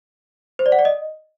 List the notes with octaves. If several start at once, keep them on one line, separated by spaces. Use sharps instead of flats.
C5
D5
F#5
D5
D#5